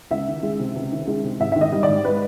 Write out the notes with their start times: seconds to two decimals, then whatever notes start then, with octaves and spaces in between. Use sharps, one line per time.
0.11 C#2 E5
0.28 D#3
0.43 G#3
0.60 C3
0.76 C#2
0.92 D#3
1.07 G#3
1.24 C3
1.40 G#1 E5
1.52 D#3 E5
1.61 D#5
1.72 G3
1.83 D5
1.89 G#2
2.05 B4